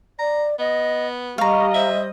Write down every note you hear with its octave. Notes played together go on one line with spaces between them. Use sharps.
D5 A#5
B3 D#5
G3 D#5 F5 A#5 C#6
C5 E5